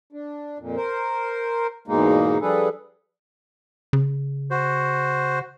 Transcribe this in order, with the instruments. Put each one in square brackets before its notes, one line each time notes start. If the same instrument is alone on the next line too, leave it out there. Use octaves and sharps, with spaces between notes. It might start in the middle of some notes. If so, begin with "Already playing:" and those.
[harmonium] D4
F2 A#2
A#4 C5
E2 G#2 B2 G#3 A#3 D#4
F3 G3 D4 G#4 A4 B4
[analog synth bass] C#3
[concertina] F#4 C5